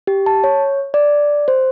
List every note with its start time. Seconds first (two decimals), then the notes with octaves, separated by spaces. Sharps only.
0.07 G4
0.26 A5
0.44 C#5
0.94 D5
1.48 C5